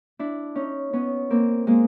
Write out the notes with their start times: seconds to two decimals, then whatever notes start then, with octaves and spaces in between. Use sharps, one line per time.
0.19 D4 E4
0.55 C#4 D#4
0.93 B3 C#4
1.30 A#3 C4
1.67 G#3 A#3